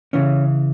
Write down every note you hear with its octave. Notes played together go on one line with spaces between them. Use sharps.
C#3 E3 C#4